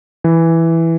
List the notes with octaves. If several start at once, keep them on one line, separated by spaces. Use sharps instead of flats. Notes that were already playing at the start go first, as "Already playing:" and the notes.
E3